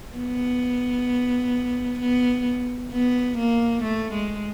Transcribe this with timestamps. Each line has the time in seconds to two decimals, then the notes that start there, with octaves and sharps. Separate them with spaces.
0.17 B3
2.00 B3
2.92 B3
3.37 A#3
3.83 A3
4.13 G#3